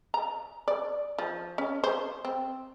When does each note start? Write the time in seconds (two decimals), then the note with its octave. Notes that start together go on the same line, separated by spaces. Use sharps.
0.14 A#5
0.68 D5
1.18 F3
1.58 C#4
1.84 C5
2.25 C4